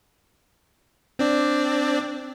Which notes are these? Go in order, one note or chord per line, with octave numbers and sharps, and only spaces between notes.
C4 D4 D5